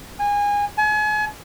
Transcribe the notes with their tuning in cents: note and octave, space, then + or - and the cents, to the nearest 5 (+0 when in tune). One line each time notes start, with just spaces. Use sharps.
G#5 -25
G#5 +35